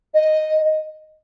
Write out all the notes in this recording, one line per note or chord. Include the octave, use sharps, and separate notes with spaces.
D#5